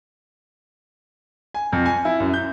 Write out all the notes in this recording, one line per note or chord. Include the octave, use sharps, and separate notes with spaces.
G#5
F2
G#5
E4
F#2
G6